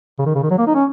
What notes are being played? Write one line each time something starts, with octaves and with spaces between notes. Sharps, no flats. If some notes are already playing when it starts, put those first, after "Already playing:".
C#3
D#3
C#3
D#3
F#3
A#3
D#4
C#4